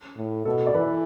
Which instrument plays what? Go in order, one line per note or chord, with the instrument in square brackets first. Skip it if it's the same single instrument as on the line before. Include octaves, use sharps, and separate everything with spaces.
[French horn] A2
[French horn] B2 [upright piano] A4
[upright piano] D5
[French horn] E3 [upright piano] B4